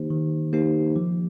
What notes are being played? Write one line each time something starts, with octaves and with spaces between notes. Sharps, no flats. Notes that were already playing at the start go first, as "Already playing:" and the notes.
Already playing: D#3 A#3 D#4 G4 C5
D#3
A#3 D#4 G4 C5
F3